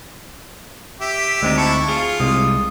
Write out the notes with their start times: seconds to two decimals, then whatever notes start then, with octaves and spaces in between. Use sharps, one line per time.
1.01 G4 E5
1.42 D2 G#3 C4 D#4
1.58 E4 A5 C#6
1.88 F4 G#4
2.20 C2 C3 G#3 D#6